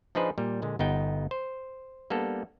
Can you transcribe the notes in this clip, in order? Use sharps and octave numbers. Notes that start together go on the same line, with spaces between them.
F3 D4 D#4 G#4 B4 C5
A#2 G3
A#2 D3 G#3
G1 B3 D#4 G5
C5
G3 A#3 B3 D4 A4